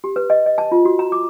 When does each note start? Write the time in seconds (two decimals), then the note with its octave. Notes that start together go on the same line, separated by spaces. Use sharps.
0.04 G4
0.16 B4
0.30 D#5
0.46 D#5
0.58 A5
0.72 F4
0.85 F#4
0.99 A#5
1.12 D6